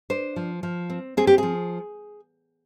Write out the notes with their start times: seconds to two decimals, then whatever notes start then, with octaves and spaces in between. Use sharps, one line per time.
0.10 D4 C5
0.36 F3
0.63 F3
0.90 C4
1.17 C4 G#4
1.27 G4
1.38 F3 G#4